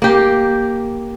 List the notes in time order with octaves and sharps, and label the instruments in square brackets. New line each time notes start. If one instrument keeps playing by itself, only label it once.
[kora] A#3 G4